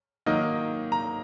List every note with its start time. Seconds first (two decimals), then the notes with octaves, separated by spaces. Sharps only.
0.26 D#3 F#3 A#3 D#4
0.92 A#5